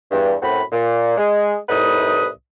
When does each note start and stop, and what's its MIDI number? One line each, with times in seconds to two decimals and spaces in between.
0.11 0.36 40
0.11 0.36 43
0.42 0.61 42
0.42 0.61 45
0.42 0.61 60
0.42 0.61 66
0.42 0.61 83
0.71 1.17 46
1.18 1.56 56
1.69 2.27 36
1.69 2.27 45
1.69 2.27 63
1.69 2.27 71
1.69 2.27 87